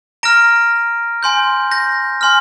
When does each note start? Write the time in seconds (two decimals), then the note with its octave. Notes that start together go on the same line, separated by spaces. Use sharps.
0.23 A#5 F6 A#6 D7
1.23 G#5 C6 G6
1.71 G6 A#6
2.21 G#5 C6 F6